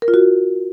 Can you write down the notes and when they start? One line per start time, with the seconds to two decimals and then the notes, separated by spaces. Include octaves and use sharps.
0.02 A#4
0.08 F4
0.14 F#4